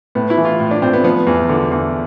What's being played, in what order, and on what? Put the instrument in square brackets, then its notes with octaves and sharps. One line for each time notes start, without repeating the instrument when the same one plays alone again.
[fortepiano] A2 B3
E4
E3
F4
A2
D4
A2 C4
B3
F3 B3
E2
D3
E2